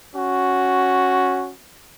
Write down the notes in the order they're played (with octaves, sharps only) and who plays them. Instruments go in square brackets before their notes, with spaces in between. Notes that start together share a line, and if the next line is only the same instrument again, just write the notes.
[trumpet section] C#4 F#4